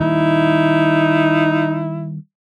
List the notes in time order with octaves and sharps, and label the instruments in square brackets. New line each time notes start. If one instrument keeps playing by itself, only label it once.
[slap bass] D#3 G3 A#3 [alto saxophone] D#4 [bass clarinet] E4